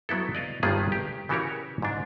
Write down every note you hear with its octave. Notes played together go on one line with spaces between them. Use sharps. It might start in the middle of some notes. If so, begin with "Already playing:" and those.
F#3 B3 E4 A4
D5 D#5 F5
G1 G2 D#3 B3 F4 G#4
G4
C#3 E3 F#4 G4 A#4 C#5
G#2 D4